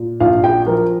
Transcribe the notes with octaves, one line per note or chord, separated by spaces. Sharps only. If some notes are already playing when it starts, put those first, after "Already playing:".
Already playing: A#2
A#1 F5
G5
F3 A#4